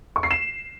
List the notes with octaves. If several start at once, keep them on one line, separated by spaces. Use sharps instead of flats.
C#6
C7
E7